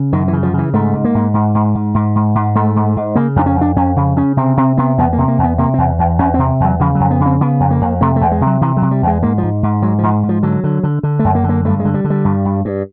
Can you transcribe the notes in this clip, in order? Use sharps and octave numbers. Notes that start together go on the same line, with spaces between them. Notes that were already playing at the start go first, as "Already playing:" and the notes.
Already playing: C#3
F#2 D#3
E3
C#3
F3
C#3 E3
G#2 A3
G#2
A#3
G#2
G#2
G#2
G#2
G#2
G#2
G#2
G#2 A3
G#2
G#2
C#3 A#3
F2 D4
C#4
F2 D4
F2 C#4
C#3
C#3 C#4
C3 C4
C3 C4
C3 B3
E2 B3
A#3
C3
A#3
E2 B3
C3 A#3
E2 C4
E2
E2 C#4
C3 C4
E2 F#3
C#3 F3
F2 F#3
B3
C#3
C4
C#3 B3
F2
A#3
F2
C3 A3
E2 A3
G#3
C3
F#3
C3 E3
F#3
C3
G3
E2 G#3
G#2 A#3
F3
G#2
G#2
G#2 F#3
G#2 F3
G#2
F3
D3 F#3
D3
D3
D3
A3
F#2
A#3
D3
A#3
G2 A3
G#3
D3
G3
D3
G3
G2
G2
G2